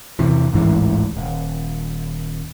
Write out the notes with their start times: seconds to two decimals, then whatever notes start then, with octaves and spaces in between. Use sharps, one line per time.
0.19 E2 C3 E3
0.52 D1 A1 G#2 E3
1.17 D#1